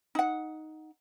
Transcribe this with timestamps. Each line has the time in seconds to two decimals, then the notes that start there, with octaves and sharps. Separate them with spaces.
0.15 D#4 F#5